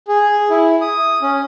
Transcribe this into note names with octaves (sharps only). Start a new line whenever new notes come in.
G#4
E4
D#6
C#4